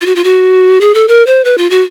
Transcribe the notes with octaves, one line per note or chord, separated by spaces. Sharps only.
F4
F#4
F4
F#4
G#4
A4
A#4
C5
B4
F4
F#4